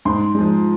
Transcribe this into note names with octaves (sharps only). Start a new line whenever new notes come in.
G#2 C6
F3 G#3